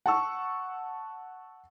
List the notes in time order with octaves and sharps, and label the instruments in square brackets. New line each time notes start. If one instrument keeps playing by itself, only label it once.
[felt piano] F#5 A5 C#6 E6